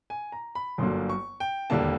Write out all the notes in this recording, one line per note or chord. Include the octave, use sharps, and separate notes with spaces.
G#5
A#5
B5
G1 F#2 D3 F#3 A#3 C6
C#6
G5
E1 D#2 D3 G3 A#3 A5